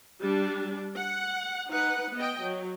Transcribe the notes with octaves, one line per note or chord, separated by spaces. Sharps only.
G3 D4
F#5
D#4 B4 F#5
B3 D#5 G5
F#3